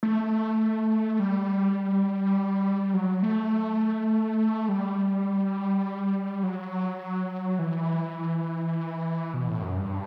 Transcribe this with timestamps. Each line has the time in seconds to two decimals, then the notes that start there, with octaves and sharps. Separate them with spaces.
0.03 A3
1.19 G3
2.94 F#3
3.23 A3
4.69 G3
6.43 F#3
7.59 E3
9.34 B2
9.48 A2
9.62 F#2
9.77 G2